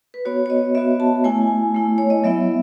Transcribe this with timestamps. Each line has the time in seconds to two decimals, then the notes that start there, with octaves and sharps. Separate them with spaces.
0.14 B4
0.25 B3 F#4 C#5
0.46 C#5
0.50 D#5
0.75 B3 F#4 E5
1.00 A5
1.24 A3 E4 G#5
1.74 A3 E4
1.98 C#5
2.10 D#5
2.24 F#3 B3 E4 E5